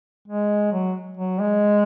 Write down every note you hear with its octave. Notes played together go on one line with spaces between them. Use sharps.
G#3
F#3
F#3
G#3